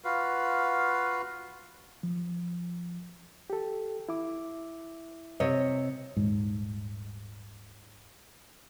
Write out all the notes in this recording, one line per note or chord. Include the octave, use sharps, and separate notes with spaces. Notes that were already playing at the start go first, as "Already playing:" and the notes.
F4 F#4 B4 F5
F3
G4 A4
E4 E5 D6
C3 C#5 D#5
D#1 G#2